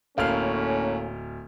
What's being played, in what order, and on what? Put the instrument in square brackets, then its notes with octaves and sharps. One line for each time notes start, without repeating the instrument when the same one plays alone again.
[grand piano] D1 F6 [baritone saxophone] A2 [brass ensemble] A#3 C#4 [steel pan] F5